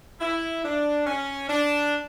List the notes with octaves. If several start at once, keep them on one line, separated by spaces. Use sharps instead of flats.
E4
D4
C#4
D4